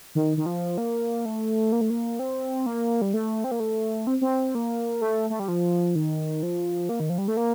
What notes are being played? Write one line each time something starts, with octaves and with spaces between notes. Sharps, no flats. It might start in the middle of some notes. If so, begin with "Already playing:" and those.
D#3
D#3
F3
A#3
A3
A#3
A3
A#3
C4
A#3
G3
A3
C4
A#3
A3
C4
C4
A#3
A3
A3
G3
F3
D#3
F3
A#3
D#3
F3
G3
A3
A#3